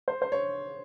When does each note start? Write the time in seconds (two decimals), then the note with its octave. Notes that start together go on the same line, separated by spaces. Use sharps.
0.08 C5
0.22 C5
0.32 C#5